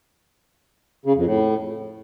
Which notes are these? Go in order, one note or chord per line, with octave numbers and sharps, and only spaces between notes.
C#3
F2
A2